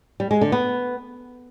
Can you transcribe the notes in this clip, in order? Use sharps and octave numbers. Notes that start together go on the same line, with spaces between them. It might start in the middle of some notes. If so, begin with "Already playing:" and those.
G3
G#3
D3
B3